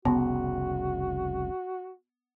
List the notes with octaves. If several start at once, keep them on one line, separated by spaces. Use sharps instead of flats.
F1 C2 C#3 B3 F#4